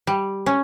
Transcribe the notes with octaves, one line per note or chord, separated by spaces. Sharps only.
G3
C#4